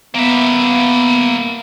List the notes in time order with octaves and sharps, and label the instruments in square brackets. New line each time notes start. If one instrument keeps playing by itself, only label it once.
[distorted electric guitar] A#3 E5 [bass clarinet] B3